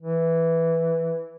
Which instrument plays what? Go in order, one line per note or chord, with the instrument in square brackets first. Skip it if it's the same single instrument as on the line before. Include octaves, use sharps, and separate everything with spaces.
[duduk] E3